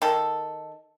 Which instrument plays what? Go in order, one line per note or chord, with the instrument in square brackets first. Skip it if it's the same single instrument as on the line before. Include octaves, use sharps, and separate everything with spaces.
[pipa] D#3 A4